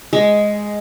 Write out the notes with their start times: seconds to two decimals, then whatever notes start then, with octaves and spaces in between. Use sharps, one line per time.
0.13 G#3